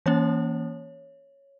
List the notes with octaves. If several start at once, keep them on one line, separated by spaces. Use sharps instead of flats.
E3 A#3 C#4 C#5